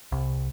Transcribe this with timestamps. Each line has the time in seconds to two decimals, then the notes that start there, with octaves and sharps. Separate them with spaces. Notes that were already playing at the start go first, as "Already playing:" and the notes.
0.12 C2